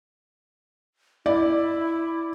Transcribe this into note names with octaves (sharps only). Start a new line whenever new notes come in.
E4 D5